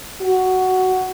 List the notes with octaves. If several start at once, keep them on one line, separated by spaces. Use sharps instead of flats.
F#4